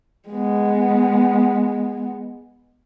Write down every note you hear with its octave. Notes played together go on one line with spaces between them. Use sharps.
G#3 B3